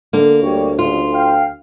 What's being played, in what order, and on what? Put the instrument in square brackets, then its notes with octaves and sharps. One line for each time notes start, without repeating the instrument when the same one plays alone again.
[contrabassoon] D3 [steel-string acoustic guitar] A#3
[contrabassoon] D2 [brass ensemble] G3 G4 C#5
[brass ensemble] G1 C#2 [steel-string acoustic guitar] F4
[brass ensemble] F5 G5